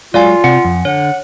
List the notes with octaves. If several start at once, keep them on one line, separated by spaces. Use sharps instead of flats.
F#3 G#3 F4 D5 F5 G#5
C3 F#5 G#5 C#7
F2
D3 C#5 F#5